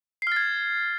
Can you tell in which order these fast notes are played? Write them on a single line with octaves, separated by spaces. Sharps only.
C7 F6 A6 G#6